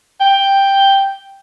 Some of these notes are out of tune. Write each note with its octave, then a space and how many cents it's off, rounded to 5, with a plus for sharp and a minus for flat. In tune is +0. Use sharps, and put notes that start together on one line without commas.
G5 +5